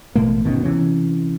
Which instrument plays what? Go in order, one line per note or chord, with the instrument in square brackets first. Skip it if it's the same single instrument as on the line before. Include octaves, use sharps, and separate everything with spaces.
[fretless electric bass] A1 B2 A3 A#3
G1 B2 D#3 C#4
C3 E3 C#4